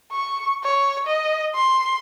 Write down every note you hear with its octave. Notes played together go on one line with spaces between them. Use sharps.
C#6
C#5
D#5
C6